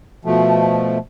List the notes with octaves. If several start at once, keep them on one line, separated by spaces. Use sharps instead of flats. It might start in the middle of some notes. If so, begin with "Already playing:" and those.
B2 F3 A3